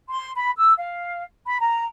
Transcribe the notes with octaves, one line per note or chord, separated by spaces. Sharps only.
C6
B5
E6
F5
B5
A#5